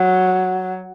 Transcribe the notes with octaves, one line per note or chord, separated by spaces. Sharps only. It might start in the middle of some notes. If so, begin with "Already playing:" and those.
Already playing: F#3